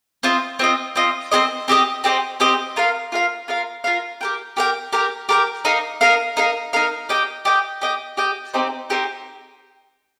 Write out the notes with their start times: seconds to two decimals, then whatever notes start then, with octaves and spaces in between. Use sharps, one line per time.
0.23 C4 F4 D#5
0.59 C4 F4 D#5
0.96 C4 F4 D#5
1.32 C4 G4 C5 D#5
1.68 C4 G4 C5 D#5
2.04 C4 G4 C5 D#5
2.40 C4 G4 C5 D#5
2.76 F4 A#4 F5
3.12 F4 A#4 F5
3.48 F4 A#4 F5
3.84 F4 A#4 F5
4.21 G4 A#4 G5
4.57 G4 A#4 G5
4.93 G4 A#4 G5
5.29 G4 A#4 G5
5.65 D#4 A#4 F5
6.01 D#4 A#4 F5
6.37 D#4 A#4 F5
6.73 D#4 A#4 F5
7.09 G4 D#5 G5
7.45 G4 D#5 G5
7.82 G4 D#5 G5
8.17 G4 D#5 G5
8.54 C4 D#4 G4 C5
8.90 C4 D#4 G4 C5